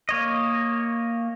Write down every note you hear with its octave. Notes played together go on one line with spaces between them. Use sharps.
A#3 C#5 D#5